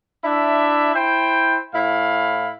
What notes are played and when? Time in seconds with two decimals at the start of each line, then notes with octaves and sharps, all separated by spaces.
0.24 D4 E4 E5
0.93 E4 C5 G5
1.73 A2 E4 F5